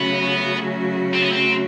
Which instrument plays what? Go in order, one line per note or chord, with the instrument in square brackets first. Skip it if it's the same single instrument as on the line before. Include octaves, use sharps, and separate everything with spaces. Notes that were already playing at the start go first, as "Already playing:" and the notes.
Already playing: [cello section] C#3 F#3 A3 C#4 F#4 [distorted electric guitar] B3
[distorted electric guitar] C4
B3
C4